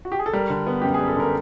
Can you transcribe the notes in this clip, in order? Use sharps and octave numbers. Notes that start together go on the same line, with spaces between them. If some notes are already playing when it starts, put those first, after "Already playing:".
F#4
G4
G#4
A4
G3 A#4
D3
B3
F#2 G4
G#4
G3
A4
D3 A#4